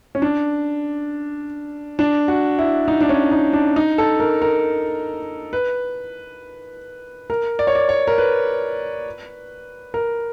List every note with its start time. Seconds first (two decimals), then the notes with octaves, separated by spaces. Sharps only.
0.15 C#4
0.22 D4
1.99 D4
2.28 F#4
2.59 E4
2.88 D#4
3.01 D4
3.09 C#4
3.31 D#4
3.53 D4
3.76 D#4
3.98 A4
4.20 A#4
4.42 A#4
5.53 B4
7.30 A#4
7.59 D5
7.67 C#5
7.75 D5
7.89 C#5
8.07 A#4
8.18 B4
9.94 A#4